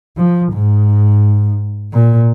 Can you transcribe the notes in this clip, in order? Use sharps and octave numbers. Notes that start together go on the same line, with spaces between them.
F3
G#2
A#2